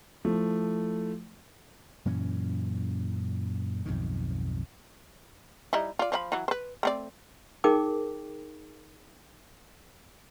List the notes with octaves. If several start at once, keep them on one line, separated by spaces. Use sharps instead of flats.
F3 A3 E4
F#2 A#2 E3 C#4
B1 F2 G#2 D#3
G3 D#4 E4
F4 D5
F3 D5 B5
E3 F#3
B4 C5
A3 C4 D5
D#4 G#4 A#4 G5 D6